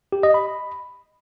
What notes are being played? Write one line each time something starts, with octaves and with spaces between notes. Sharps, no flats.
G4
D#5
B5